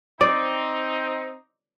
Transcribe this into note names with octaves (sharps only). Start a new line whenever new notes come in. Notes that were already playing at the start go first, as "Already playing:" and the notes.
C4 D#4 D5